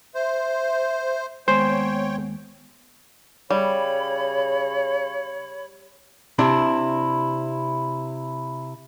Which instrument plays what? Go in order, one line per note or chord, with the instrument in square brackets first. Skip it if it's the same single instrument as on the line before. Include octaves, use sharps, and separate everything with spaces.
[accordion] C5 [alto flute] E5
[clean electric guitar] D#2 G#3 G#5 [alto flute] B3 [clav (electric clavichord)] C5 [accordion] C#5 G5
[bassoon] C#3 [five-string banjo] G3 [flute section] C#5 B5
[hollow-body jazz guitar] C3 D4 E4